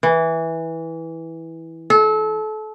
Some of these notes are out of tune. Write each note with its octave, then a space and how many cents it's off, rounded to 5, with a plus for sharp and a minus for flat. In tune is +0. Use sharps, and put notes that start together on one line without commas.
E3 -10
A4 -30